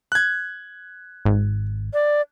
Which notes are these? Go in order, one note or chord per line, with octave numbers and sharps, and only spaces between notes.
F#6 G#6
G#1
D5